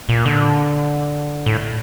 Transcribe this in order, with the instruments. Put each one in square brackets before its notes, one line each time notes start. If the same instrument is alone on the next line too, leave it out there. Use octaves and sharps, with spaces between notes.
[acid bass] A#2
D3
A2